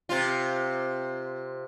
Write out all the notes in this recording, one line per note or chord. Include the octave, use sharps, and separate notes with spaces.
C3 F4